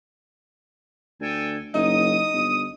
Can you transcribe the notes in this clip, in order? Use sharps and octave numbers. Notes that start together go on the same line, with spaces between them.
D2 A4 G5 G#5
F#1 D#4 D#6
G1